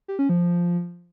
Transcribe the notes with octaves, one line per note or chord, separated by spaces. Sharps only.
G4
C#4
F3